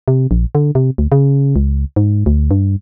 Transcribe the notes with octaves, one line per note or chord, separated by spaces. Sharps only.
C3
A#1
D3
C3
D2
C#3
C#2
G#2
D2
G2